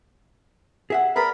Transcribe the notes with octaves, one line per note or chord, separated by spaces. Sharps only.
G#4 E5 F#5
G#4 A#4 B4 D5 B5